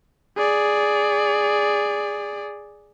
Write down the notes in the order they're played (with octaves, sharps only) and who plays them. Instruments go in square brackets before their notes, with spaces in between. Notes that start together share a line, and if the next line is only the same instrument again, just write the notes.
[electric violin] G#4 D5